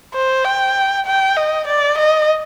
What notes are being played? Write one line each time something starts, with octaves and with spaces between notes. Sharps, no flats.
C5
G5
G5
D#5
D5
D#5